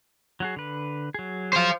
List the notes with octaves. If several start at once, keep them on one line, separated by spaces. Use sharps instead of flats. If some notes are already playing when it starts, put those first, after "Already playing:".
F#3 F#4 G#4
D3 B4
F#3 G#4
C5 F5